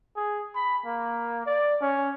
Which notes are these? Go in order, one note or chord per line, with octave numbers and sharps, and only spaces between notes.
G#4
B5
A#3
D5
C#4